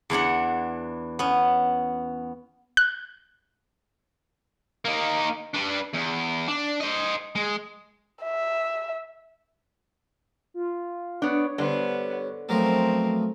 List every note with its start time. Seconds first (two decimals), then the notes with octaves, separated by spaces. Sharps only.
0.10 E2 E3 D4 F#5
1.19 B3 C#4
2.77 F#6
4.85 A#3 D#4
5.54 D4 B4
5.94 E2
6.48 D4
6.80 C5 D#5
7.35 G#3
8.24 E5
10.54 F4
11.22 B3 D4 C#5
11.58 G2 D3 B3 C5
12.49 F3 F#3 A3 B3 C4 A#4